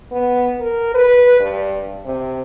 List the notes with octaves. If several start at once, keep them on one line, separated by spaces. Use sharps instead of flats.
B3
A#4
B4
G2
C3